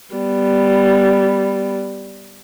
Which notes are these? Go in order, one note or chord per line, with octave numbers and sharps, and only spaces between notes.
G3 B3